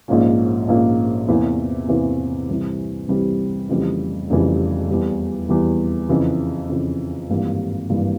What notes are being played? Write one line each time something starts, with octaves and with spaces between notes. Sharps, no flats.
A#1 G#2 F3 A#3 C#4
A#1 G#2 F3 A#3 C#4
E2 C3 E3 A#3 E4
E2 C3 E3 A#3 E4
C2 C3 E3 G3
C2 C3 E3 G3
F1 F2 C#3 E3 G3
F1 F2 C#3 E3 G3
E2 E3 G3
E2 E3 G3
F2 C#3 E3
F2 C#3 E3
G#1 G2 E3 G3 A#3
G#1 G2 E3 G3 A#3